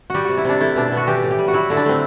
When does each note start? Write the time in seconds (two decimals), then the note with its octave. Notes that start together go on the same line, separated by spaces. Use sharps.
0.10 G3 F#4 G4
0.25 C3 F#4
0.38 E4
0.45 C3 D4
0.60 A3 E4
0.76 B2 D4
0.87 B2 E4
0.97 F#4
1.07 E3 G4
1.22 A2
1.31 G4
1.38 G3
1.48 F#4
1.54 F#3 E4
1.70 D3 E4
1.77 D4
1.85 A3 C4